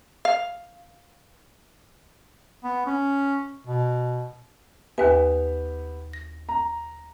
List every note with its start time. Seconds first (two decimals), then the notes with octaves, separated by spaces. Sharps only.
0.25 F5
2.64 B3
2.86 C#4
3.67 B2
4.98 D#2 B3 G4 B4 E5 G#5
6.13 A#6
6.49 A#5